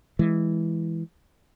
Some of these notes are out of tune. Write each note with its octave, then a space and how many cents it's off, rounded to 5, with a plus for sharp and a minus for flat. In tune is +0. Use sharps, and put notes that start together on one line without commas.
E3 +0 G#3 +0